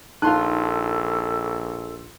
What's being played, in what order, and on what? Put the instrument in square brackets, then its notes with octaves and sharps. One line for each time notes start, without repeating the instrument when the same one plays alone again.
[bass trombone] A#1 [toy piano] D#4 A5 [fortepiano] F4 C6 F#6 [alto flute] A4